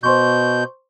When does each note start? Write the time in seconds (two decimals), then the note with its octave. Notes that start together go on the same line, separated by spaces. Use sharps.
0.03 B2 C5 C6 C#6 G6